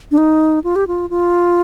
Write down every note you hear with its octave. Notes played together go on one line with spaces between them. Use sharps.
D4
D#4
F4
G4
F4
F4